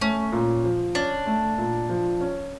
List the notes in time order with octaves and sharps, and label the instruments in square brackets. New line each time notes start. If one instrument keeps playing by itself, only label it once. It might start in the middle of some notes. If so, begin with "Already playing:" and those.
[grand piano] A3 [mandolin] C#4
[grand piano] A#2
F3
[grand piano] C#4 [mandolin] D4
[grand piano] A3
A#2
F3
C#4